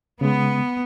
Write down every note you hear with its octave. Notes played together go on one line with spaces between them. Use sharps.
C#3 G#3 B3